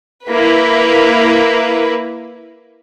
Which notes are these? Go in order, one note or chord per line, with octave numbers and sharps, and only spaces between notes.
A#3 E4 B4